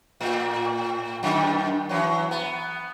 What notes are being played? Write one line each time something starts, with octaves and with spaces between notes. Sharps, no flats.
A2
F#2 D#3
E3 F#3
B3